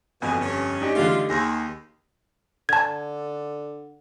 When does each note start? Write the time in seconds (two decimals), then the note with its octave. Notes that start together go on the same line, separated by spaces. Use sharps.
0.22 G1 F2 B2 G#5 D#6
0.41 G2 C#4
0.81 D4 D#4 G4
0.95 D3 G3 A3 F4
1.30 D#2 G#4 C6 A#6
2.69 D3 A5 G#6